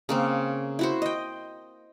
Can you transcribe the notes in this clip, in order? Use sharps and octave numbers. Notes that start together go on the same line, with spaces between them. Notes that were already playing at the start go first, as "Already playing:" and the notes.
C#3 A#3 C4
E4 F#4 C5
D#5 G5